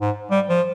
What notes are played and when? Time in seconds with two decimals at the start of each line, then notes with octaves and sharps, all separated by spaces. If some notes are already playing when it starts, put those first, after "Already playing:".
0.01 G#2
0.31 G3
0.49 F3